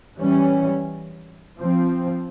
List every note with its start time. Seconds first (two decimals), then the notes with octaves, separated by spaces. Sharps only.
0.18 E3 G3 C#4
1.58 F3 C4